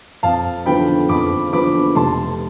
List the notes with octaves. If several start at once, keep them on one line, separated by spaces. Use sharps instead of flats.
F2 F5 A5
D3 F3 B3 G5 B5
F2 B5 D6
D3 F3 B3 B5 D6
F1 A5 C6